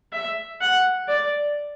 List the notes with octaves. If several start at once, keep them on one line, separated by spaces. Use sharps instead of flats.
E5
F#5
D5